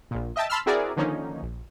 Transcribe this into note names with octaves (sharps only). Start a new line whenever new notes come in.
A#1 A#2
D#5 E5 G5 A5
A5 B5 C6 E6 F6
C4 E4 F#4 G#4 A#4 D5
D3 D#3 F3 A#3 C#4 D#4
A#1